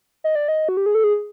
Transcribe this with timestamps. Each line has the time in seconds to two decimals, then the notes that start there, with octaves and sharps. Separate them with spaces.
0.24 D#5
0.35 D5
0.48 D#5
0.69 F#4
0.77 G4
0.86 G#4
0.95 A4
1.04 G#4